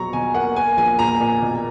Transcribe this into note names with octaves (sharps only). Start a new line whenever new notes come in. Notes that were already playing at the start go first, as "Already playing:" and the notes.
Already playing: A#1 B2 F#3 A#5 C#6
B2 G#5
A#3 F#5
A#3 G#5
A#1 G#5
A#2 A#5
A#2
B2